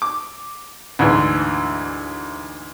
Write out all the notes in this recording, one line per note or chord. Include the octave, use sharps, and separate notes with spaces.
D6
D2 G#2 E3